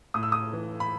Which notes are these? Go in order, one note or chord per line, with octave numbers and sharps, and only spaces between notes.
A2 D#6
E6
D#6
E3
B5